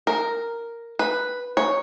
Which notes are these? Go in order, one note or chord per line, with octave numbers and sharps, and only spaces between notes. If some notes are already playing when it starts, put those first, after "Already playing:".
A#4
B4
C#5